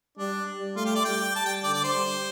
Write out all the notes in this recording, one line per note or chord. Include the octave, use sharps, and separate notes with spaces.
G3 D4
A3 F4
G4
D5
G3 G5
A5
G5
D3 D5
D5
C5
G3